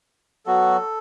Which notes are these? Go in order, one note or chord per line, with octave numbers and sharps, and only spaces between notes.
F#3 B3 F#4 A4